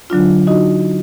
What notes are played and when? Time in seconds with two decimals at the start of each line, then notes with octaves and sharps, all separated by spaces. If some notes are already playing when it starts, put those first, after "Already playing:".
0.10 D3 F#3 D4 F4
0.47 D#4 F#4 D#5